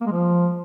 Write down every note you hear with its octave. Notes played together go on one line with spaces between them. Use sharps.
A#3
G#3
F3